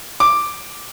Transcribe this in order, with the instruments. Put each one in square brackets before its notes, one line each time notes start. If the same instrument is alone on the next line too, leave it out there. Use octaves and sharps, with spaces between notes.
[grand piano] D6